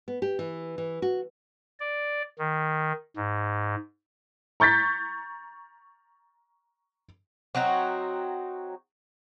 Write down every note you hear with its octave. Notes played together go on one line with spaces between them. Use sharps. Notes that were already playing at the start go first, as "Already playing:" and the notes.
B3
G4
E3
E3
F#4
D5
D#3
G#2
A#5 C#6 G6 A6 B6
F#3 C4 D#4 F#4